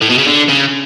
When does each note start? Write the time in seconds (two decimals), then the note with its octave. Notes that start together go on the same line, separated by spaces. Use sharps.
0.01 A2
0.09 B2
0.18 C#3
0.26 D3
0.48 C#3